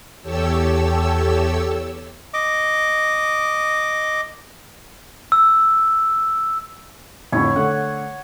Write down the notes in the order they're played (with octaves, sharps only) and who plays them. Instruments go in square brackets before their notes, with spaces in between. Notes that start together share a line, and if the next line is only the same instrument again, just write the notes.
[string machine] E2 G4 A4 C#5 E6
[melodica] D#5 D6
[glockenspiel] E6
[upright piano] F2 A2 D3 [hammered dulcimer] C#5
[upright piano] D3 A3 [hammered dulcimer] F#5